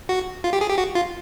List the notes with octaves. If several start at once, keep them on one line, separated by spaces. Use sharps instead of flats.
F#4
F4
G4
G#4
G4
F#4
F4